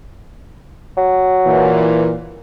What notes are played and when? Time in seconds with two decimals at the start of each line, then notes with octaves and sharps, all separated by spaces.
0.97 F#3
1.46 A#2 E3